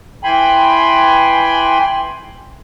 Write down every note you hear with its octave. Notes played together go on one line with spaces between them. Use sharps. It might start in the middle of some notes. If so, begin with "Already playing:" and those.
E3 G5 G#5 B5 C6